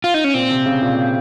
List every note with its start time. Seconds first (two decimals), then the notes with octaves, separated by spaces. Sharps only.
0.04 F4
0.14 D#4
0.24 C#4
0.34 A#2 C4
0.51 C3
0.66 C#3
0.81 A#2